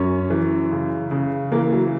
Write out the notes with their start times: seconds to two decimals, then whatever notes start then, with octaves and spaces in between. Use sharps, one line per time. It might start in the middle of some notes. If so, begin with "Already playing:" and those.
Already playing: F#2 C#4
0.30 E3
0.71 C#3
1.11 C#3
1.52 E3 A#3
1.73 F#3